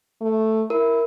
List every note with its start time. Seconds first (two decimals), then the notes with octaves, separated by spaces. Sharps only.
0.21 A3
0.70 E4 A#4